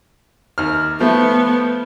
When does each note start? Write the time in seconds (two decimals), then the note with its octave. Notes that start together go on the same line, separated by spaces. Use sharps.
0.58 D#2 F6
1.00 F3 A3 B3